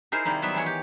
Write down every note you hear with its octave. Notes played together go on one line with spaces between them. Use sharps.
D#4 E4 G#4 A#4 C5
C3 D#3 G3 A#3 E4 A#4
F#3 G3 B3 E5
D#3 E3 G#3 C#5
G4